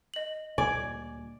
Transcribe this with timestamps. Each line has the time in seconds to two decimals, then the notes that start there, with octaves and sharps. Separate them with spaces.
0.14 D#5 F#7
0.58 D2 A#2 G3 D5 G#5